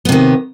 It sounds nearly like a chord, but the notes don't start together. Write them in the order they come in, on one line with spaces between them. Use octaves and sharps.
B3 C3 D#3